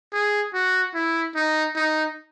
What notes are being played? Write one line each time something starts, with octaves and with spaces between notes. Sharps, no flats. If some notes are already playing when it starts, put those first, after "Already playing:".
G#4
F#4
E4
D#4
D#4